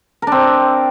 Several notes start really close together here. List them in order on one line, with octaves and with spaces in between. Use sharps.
A#4 D4 C4